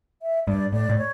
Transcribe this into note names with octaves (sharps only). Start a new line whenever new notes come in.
E5
G2 D5
A2 D5
A2
C#5